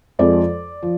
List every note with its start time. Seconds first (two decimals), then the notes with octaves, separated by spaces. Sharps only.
0.19 F2 F3 G#3 D5
0.83 F3